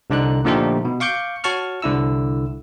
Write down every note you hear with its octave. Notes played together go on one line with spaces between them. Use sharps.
C2 D3 D#4 F#6
A#2 D3 F3 A3 D#4 G4
B2
F5 C#6 D6 G6 C#7
F#4 C#5 A5 C#6 F6
C2 D3 E4 E6